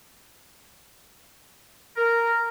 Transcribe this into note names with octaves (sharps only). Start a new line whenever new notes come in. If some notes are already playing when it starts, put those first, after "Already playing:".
A#4